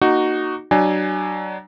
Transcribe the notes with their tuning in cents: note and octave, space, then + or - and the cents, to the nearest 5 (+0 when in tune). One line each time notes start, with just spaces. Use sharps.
A#3 +0 D#4 -15 F#4 +5
F#3 +35 D4 +30 G#5 +0